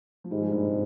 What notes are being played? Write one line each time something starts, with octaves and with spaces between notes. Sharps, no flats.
F3
G#2 D#3 G3
F3 G#3
G2 A#2
C3